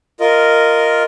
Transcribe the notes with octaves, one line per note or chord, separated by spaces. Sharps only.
F4 A#4 D#5